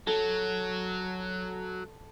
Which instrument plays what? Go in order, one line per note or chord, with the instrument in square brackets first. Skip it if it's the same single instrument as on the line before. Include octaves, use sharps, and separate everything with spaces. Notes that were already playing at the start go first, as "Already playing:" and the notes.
[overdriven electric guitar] F#3 [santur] A4